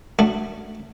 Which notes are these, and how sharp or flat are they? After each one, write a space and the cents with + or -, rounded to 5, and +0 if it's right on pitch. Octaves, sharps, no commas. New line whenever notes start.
A3 +0 D4 +15 F#4 +0